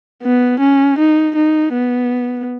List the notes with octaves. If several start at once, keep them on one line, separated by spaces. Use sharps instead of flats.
B3
C#4
D#4
D#4
B3